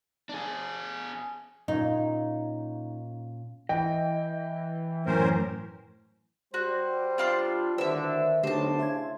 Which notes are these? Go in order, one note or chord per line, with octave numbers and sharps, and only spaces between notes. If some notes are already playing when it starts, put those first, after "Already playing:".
D4 G#4
A#2 C#4 D#4
E3 D#5 G5
F#2 A2 C#4 A#4 C5
G3 F#4 C5
D4 F4 C6
D2 A2 D3 D#3 B4 C5 E5 E6
B1 D3 A3 D4 G4 C5 A5
A2 C#3 E5 C6 G#6